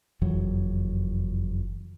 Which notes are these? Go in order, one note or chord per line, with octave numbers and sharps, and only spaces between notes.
F#1 F2 E3 F#3